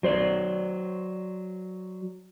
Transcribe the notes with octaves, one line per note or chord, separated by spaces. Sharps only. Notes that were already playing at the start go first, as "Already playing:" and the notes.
F#3 C5 D5